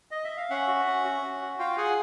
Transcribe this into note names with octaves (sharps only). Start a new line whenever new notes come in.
D#5
E5
F5
C#4 E5 F#5
F#4
C#4
F#4
C#4
F#4
F4 F5 G5
G#4 F#5 G#5